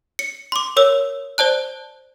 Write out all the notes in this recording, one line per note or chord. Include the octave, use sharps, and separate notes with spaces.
C#7
C6 D6
A#4 C#5 E6
C5 D5 A5 F#6